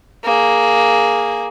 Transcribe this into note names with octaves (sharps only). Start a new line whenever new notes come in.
A#3 G#4